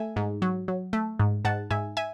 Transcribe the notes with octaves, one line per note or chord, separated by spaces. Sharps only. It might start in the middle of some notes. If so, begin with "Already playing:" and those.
Already playing: A3 E5 G#5
G#2
F#3
F#3
A3
G#2
G#2 F#5 A5
G#2 E5 G#5
E5 G#5